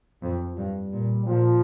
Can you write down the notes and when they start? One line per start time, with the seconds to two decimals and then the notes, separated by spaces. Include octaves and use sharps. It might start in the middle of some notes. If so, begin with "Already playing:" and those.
0.22 F2 F3
0.57 G2 G3
0.93 A#2
1.27 A#2 F3